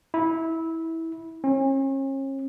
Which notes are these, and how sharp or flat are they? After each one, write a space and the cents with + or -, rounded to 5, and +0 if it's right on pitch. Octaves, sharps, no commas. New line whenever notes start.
E4 -20
C#4 -40